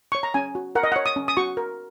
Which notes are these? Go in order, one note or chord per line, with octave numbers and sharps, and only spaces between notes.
C#5 C#6
A#5
C#4 G#5
F#4
A#4 F#5
D#5
F#5
C#5
D#6
C#4
D#6
F#4 C#6
A#4